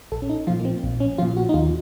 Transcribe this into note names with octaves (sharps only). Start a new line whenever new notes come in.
A#1 A4
C#4
D#4
A#2 F3 F4
A#3
C4
A#1
C#4
A#2 F3 F4
F#4
D#4
D#2 F4